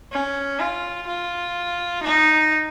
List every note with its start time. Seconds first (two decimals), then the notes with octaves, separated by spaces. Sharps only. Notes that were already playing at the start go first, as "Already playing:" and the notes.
0.12 C#4
0.60 F4
1.07 F4
2.03 D#4